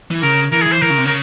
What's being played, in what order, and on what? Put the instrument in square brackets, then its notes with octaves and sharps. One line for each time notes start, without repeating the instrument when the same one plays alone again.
[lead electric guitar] E3
[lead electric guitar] C#3 [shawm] A#4
[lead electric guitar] E3 [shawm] A#4
[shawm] G#4
[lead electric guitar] E3
[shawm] C5
[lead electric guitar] E3 [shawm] A#4
[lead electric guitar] C#3
C3
[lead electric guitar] C#3 [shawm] A#4